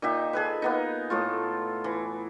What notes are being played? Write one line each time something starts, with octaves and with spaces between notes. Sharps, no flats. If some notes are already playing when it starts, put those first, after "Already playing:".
A#2 D#4 G4 E5
G#4 A4 B4
A#3 B3 D#4
A2 A3 F4
E3